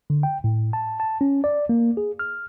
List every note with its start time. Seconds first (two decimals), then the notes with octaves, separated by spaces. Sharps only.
0.10 D3
0.23 G5
0.44 A2
0.73 A5
1.00 A5
1.21 C#4
1.44 D5
1.69 A#3
1.97 G#4
2.19 F6